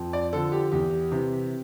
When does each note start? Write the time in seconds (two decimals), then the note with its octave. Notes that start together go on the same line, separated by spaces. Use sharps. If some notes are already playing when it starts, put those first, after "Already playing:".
Already playing: F2
0.13 D5
0.33 D3 F3 A4
0.52 G4
0.72 E2 G4
1.12 C3 E3